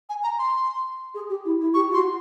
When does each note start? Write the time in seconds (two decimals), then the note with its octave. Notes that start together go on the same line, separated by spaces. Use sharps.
0.09 G#5
0.23 A#5
0.39 C6
1.14 G#4
1.29 G4
1.45 E4
1.60 E4
1.74 G4 C#6
1.89 F4
1.94 F#4 C6